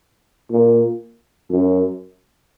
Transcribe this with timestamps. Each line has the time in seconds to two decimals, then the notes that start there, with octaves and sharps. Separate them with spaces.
0.50 A#2
1.50 F#2